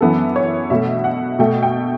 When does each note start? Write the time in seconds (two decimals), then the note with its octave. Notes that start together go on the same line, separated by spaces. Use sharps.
0.01 F#2 E3 B3 A4
0.36 C#5
0.70 B2 A3 E5
1.04 F#5
1.39 B2 A3 G5
1.63 G5